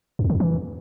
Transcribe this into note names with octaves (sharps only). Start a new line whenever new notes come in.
F#2
E2
D3
E2
E3